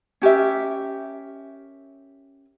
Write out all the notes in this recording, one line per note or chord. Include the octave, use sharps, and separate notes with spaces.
C#4 G4 A#4 E5